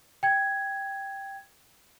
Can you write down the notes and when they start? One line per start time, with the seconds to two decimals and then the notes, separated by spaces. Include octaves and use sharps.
0.23 G5 G#6